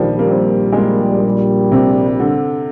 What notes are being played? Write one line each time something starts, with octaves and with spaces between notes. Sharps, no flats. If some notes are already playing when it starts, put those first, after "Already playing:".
Already playing: A#1 A#2 D#3 F3 G3
A#3
C4
G#3
A#3
C3
D3